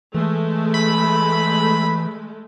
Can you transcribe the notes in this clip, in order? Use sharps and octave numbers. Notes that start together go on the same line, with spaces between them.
E3 G#3 A3
B5